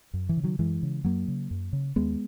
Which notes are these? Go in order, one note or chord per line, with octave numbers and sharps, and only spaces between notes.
F#2
E3
C#3
D#3 F#3
F#2 E3 G#3
C#3
F#2 F#3 A#3
C#3
F#2
C#3
D#2 G#3 B3